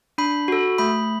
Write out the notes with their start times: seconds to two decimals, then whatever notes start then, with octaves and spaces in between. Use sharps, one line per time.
0.18 D4 B5
0.48 F#4 A4
0.78 A3 B5